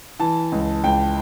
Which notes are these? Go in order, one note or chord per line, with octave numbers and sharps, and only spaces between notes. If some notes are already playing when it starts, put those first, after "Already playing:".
E3 A5
C#2
C#2 G5